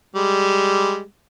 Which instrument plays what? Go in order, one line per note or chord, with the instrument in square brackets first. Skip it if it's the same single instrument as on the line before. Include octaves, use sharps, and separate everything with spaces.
[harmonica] G3 G#3